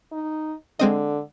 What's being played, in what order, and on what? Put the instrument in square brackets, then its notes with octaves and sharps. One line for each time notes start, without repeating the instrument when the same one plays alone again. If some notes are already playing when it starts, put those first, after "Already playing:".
[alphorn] D#4
[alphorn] D3 [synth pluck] G#3 C4 D#5